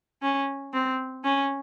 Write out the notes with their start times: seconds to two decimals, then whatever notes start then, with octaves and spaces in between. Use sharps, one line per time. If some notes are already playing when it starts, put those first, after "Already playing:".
0.22 C#4
0.74 C4
1.24 C#4